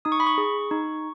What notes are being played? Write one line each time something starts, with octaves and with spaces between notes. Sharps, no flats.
D#4 D#6
C#6
B5
C#6
G#4
D#4